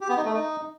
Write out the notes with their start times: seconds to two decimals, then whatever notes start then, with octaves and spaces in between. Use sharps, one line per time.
0.01 G4
0.09 B3
0.17 D#4
0.25 A3
0.33 D#4